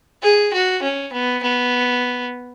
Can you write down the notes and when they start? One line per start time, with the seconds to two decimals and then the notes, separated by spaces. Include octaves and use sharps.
0.22 G#4
0.53 F#4
0.82 C#4
1.12 B3
1.42 B3